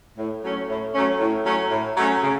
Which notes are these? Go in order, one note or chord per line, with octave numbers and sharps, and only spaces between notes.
A2
F#3 A3 C#4
A2
F#3 A3 C#4
A2
F#3 A3 C#4
A2
F#3 A3 C#4
C#3